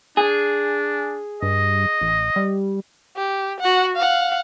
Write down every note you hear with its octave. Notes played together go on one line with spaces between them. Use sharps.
D4 G#4
G2 D#5
A1
G3
G4
F#4 F#5
F5 F#5